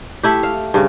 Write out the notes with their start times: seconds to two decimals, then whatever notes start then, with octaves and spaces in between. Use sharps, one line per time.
0.23 A3 E4 G4
0.43 F5
0.74 G2 C#3